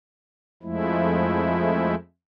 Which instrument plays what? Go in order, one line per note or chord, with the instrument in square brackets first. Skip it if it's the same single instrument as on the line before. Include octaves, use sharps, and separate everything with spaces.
[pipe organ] F2 F3 G#3 A3 E4